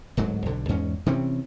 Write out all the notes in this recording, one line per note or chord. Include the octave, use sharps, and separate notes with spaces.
D1 G#2 F#3
B1 D3
E2 G#2 C#4
C3 E3 C4 C#4